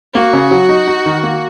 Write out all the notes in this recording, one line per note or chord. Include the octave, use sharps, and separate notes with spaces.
A#3 F#4
C#3
F#3
D#4
D#4
D#3
A#3